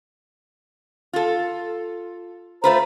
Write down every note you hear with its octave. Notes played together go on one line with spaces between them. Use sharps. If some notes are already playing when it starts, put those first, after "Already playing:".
F4 A4
A3 F4 B4 C5 A#5